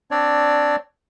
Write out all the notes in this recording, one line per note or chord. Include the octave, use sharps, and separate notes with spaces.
C4 D4 C#5 D5